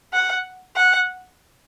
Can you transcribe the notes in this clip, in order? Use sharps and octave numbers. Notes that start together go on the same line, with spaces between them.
F#5
F#5